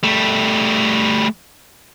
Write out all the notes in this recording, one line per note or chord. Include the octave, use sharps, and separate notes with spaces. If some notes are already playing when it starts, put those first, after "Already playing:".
G3 A3